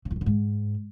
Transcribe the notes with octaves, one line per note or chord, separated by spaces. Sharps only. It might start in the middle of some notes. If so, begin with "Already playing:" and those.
C#3
E2
F2
D3
G#2